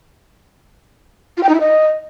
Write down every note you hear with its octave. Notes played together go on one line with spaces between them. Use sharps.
F4
G5
D#4
E4
D#5